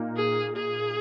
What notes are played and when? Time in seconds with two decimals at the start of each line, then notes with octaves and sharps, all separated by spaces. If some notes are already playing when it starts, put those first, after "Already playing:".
Already playing: A#2 A#3 D#4
0.17 G#4
0.56 G#4